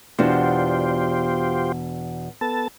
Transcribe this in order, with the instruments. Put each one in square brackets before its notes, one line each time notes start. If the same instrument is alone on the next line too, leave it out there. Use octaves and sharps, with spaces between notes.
[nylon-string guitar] E2 B2 D4 [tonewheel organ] F4 G4 C5
[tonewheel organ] B3 A4 A5